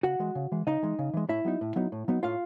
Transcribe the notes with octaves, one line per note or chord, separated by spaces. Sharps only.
C#3 F#4 F#5
E3 G#3
C#3
E3 G#3
C#3 D#4 D#5
E3 G#3
C#3
E3 G#3
A2 E4 E5
F#3 B3 D#4
A2
F#3 B3 D#4
A2
F#3 B3 D#4
A2 F4 F5